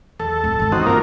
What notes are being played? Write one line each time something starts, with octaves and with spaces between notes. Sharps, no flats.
E2 A4
D1
G#1 D3
E3 C4 C#4 D#4 F#4
G1 D3 A#3 F4 A#4